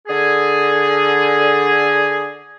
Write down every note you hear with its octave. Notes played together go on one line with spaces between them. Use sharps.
D3 G#4